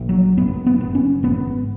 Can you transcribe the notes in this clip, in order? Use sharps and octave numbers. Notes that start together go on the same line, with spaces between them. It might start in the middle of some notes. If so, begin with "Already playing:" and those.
Already playing: A#1 A#2
F#3
F#1 B3
B3
F#1
C#4
G#1 B3